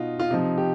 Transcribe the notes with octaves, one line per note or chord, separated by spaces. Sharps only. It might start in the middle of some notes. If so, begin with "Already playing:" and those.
Already playing: B2 D#4 F4
F4
C3 F3 D#4
G4